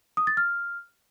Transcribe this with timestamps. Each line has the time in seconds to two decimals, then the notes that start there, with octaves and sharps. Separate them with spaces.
0.17 D#6
0.27 A6
0.37 F6